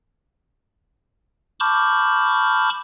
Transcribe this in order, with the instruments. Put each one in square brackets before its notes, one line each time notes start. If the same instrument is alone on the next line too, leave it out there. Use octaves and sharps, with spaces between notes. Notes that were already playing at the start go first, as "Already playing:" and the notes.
[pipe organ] A5 B5 C#6 D6 F6 G6